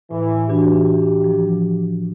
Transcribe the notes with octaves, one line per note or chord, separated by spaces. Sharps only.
A2 E3
E3 D4 F#4 G4
F3